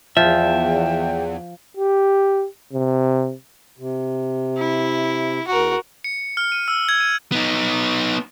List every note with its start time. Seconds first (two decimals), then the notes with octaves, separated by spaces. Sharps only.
0.17 E2 F3 E5 G5
1.77 G4
2.73 C3
3.78 C3
4.58 E4
5.47 E2 F#4 A#4
6.04 C#7
6.37 F6
6.52 D#7
6.68 E6
6.89 G#6
7.00 D#7
7.32 B3 D#4